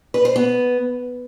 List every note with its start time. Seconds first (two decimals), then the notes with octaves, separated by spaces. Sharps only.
0.14 B4
0.25 C5
0.36 B3